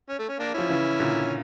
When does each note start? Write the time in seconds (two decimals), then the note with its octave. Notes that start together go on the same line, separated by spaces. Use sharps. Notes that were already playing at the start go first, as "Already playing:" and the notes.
0.09 C#4
0.19 A3
0.29 C#4
0.39 A#3 D4
0.54 F3 C#4 E4
0.69 C#3 E3
0.99 A#2 D3